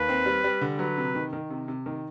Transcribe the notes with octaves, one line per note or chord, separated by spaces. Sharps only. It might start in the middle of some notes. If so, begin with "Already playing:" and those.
Already playing: D#2 B4
C4
G3
G3
D3
F#3 B4
C3
D#3
D#3
C3
C3
D#3